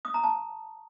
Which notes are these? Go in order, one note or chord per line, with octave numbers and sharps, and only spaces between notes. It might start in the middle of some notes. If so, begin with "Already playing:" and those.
D#6
A#5
A5